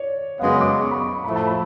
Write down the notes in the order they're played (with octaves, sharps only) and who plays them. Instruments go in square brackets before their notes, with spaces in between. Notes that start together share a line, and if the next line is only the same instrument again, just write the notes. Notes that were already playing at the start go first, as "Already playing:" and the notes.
Already playing: [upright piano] C#5 D5
[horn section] F#2 C#3 G#3 B3 [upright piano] F5
[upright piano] D6
C#6
B5
C#6
[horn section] A2 F3 A3 [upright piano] B5
[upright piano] A5
B5